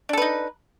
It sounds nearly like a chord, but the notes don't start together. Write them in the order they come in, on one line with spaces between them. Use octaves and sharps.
D4 A4 B4 D#4